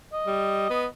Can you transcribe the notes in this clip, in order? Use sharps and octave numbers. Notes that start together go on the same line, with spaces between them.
D#5
G3
B3